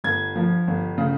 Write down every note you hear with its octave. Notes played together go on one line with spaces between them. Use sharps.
G1 G#6
F3
G1
C#3